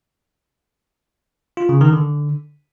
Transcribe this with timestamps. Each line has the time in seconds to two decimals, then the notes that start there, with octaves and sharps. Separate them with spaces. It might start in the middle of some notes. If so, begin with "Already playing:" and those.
1.57 F4
1.69 C#3
1.81 D#3
1.93 D3